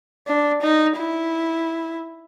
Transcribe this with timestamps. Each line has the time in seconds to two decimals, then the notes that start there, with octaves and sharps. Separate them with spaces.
0.27 D4
0.62 D#4
0.97 E4